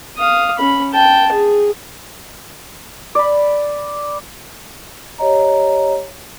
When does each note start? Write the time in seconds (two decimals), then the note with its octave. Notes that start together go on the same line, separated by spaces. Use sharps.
0.17 F5 D#6
0.58 C#4 B5
0.93 G5 A5
1.32 G#4
3.15 D5 B5
5.18 G4 C#5 D#5 A#5